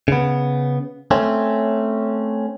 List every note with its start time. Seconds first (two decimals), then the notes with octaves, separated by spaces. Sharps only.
0.08 C#3 B3
1.11 A3 C4 C#4